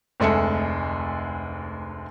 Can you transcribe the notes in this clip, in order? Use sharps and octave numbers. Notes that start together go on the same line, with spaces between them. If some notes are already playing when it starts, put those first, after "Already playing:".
F1 D2 G#3 A4 E5 C#7